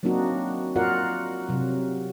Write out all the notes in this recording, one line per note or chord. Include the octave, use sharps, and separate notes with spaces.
F#3 A#3 C4 D4 D#4 F#4
F4 F#4 A#4 D5 F5 F#5
C3 F#3